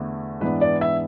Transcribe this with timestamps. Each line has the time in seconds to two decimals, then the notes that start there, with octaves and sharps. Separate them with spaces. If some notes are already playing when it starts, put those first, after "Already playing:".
Already playing: E2 D3 A3
0.40 G#2 E3 B3 D4 B4
0.61 D5
0.81 E5